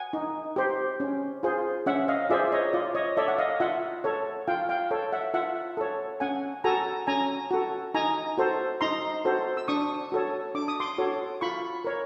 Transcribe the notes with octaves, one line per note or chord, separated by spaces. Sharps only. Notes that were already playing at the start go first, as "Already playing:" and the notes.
Already playing: F#5 G#5
D#4
G4 C5
C#4
F4 G#4 C5
C#4 E5 F#5
D#5 F5
F4 G#4 C5 D5 E5
C#5 D#5
F4 D5
C#5 D#5
A4 C#5 D5 E5
F#5
D#5 F5
F4 E5 F#5
A4 C#5
F4 F5 G5
F5 G5
A4 C#5
E5 F#5
F4 E5 F#5
A4 C#5
C#4 F#5 G#5
F#4 A4 G#5 A#5
C#4 G#5 A#5
F#4 A4
D#4 G#5 A#5
F#4 A4 C5
D#4 A#5 C6
F#4 A4 C5
E6
D4 C#6 D#6
F#4 A4 C#5
D4 D6
D#6
C6 D6
F#4 A4 C#5
F4 B5 C#6
A#4 C#5